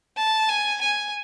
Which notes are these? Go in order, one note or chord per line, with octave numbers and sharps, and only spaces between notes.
A5
G#5
G#5